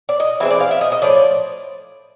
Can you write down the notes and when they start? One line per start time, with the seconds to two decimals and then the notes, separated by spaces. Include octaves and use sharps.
0.09 D5
0.20 D#5
0.40 E3 G#3 C4 E5
0.51 D5
0.61 F5
0.71 E5
0.81 D#5
0.92 D#5
1.02 A2 F3 D5